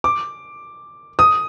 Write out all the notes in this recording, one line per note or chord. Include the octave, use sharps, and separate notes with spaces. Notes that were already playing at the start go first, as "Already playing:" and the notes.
D6
D#6